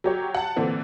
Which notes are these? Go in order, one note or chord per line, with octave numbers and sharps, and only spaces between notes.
F#3 G4 C#5
F#5 A5
A#2 D3 E3 C4